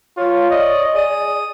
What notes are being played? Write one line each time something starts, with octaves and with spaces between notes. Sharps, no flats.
F4 C#5
D5 D#5
G#4 D#6